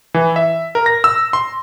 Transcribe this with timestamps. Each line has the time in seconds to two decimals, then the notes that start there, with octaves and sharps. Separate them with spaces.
0.14 E3
0.36 E5
0.75 A#4
0.86 A#6
1.04 E6
1.33 C6